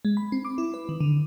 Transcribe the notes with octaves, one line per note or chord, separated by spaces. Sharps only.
G#3
B5
C4
D6
E4
B4
D#3
D3